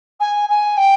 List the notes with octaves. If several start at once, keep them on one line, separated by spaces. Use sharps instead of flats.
G#5
G#5
G5